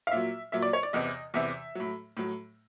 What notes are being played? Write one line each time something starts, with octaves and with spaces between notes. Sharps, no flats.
F5
A#2 F#3 E5
A#2 F#3 E5
D5
C#5
D5
E2 C3 E3 D#5
E2 C3 E3 E5
A2 F#3
A2 F#3